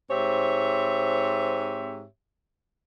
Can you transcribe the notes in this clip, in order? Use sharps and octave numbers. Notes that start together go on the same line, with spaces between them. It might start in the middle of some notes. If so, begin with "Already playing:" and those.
G#2 C4 G4 C#5 E5